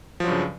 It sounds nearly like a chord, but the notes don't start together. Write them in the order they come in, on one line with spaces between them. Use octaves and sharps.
F3 F#3 G2 C#3